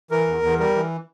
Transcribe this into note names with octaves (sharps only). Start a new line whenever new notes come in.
E3 A#4
E2
E2
G3 A#4
E3